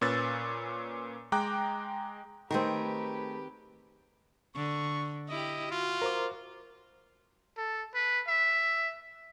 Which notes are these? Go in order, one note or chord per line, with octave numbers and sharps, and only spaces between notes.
A#2 C#4 B4 E6 A6
G#3 G5 A#5 D6 F#6
D#3 A3 C4 G4 G#4 A#4 B4
D3 C#6
E4 G4 D#5
F4 F#4
A#4 C5 D6
A4
B4
E5